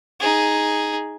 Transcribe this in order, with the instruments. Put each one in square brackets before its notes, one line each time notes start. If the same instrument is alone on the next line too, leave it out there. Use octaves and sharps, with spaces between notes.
[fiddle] D#4 G#4